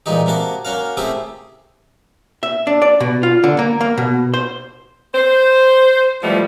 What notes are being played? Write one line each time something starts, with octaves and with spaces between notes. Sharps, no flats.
A#2 E3 G#3 D#4 G4
C3 A#3 F#4 A5
A#3 C#4 F#4 F5
C3 A3 E4 G4 G#4 C5
E5
D4
D5
B2
F4
D3
A#3
A#3
B2
C5
C5
E2 B2 F3 G3 A3